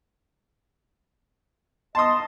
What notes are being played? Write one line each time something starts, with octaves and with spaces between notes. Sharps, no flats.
D#5 A5 C6 D#6